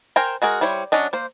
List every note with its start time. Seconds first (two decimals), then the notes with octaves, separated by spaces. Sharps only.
0.16 A#4 C5 G5 G#5 A#5
0.42 G#3 F#4 G#4 A#4
0.61 G3 E4 C5 C#5
0.92 F#3 C#4 D4 D#5
1.13 A#3 C5